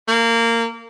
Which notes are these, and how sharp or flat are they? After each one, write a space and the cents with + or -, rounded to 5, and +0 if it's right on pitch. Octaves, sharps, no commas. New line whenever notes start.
A#3 -20